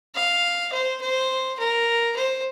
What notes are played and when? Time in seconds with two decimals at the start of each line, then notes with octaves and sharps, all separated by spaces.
0.15 F5
0.72 C5
1.01 C5
1.58 A#4
2.16 C5